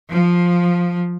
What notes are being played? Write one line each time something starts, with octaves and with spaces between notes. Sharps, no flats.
F3